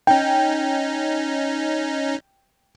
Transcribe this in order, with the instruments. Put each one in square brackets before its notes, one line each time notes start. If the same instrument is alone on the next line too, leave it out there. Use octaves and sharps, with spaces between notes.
[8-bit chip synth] C#4 D#4 [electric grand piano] G5